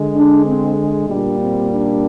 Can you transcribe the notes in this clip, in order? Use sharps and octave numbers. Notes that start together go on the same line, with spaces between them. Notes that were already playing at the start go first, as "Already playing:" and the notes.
Already playing: D3 G#3
D4
C4
A#2 G3 A#3 D4
C4
D4